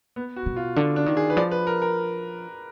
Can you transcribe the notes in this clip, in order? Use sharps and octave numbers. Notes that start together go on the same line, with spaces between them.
B3
F#4
B2
F4
D3 D4
D4
D#3
G#4
B4
F3 D5
B4
A#4
A#4